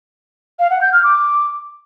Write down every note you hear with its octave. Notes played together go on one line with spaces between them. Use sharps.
F5
F#5
G6
F6
D6